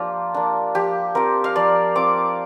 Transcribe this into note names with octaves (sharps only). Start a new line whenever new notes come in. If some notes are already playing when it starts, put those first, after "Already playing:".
Already playing: F3 A#3 D4 F4 G4
A#3 D4
F3 G4
C4 F4 A#4
F5
F3 D5
C4 F4 D6